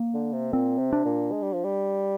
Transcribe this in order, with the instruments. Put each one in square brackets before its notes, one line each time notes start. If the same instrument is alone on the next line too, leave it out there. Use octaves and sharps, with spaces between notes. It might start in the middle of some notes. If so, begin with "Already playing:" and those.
Already playing: [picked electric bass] A#3
[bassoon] D3
C3
[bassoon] A#2 [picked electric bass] C4
[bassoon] C3
[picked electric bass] D4
[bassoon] A#2
G#3
G3
F3
G3